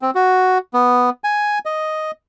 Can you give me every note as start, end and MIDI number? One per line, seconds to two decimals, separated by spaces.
0.02 0.10 60
0.15 0.58 66
0.74 1.10 59
1.24 1.59 80
1.66 2.11 75